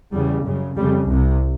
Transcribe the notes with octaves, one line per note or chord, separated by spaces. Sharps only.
E2 C#3 G3
F#2 C#3
F2 C#3 G3
C2 C3